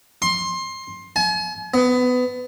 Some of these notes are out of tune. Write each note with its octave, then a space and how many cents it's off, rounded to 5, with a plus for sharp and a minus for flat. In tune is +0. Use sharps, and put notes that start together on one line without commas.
C6 +20
G#5 +45
B3 +20